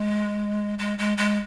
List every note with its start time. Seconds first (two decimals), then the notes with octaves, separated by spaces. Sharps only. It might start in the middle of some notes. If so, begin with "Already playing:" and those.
Already playing: G#3
0.79 G#3
0.98 G#3
1.17 G#3